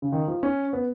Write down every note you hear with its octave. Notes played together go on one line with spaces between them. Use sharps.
C#3
D#3
F3
C#4
B3